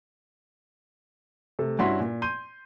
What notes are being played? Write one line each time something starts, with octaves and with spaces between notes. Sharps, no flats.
C3 A3 A4
G2 C#4 E4 F#4 C6 B6
A#2
C6 G6 D#7